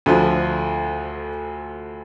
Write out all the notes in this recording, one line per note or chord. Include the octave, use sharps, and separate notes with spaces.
D2 D3 F3